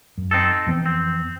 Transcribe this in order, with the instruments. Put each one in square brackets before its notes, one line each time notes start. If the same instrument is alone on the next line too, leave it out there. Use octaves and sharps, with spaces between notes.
[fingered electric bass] F#2
[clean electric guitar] C4 D#4 A4
[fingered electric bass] F2 E3 B3
[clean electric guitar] C4